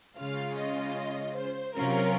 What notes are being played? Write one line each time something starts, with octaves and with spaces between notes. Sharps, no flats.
C#3 G#3 C#4 F4 F5
D#5
C5
C3 F#3 C#4 F4 A#4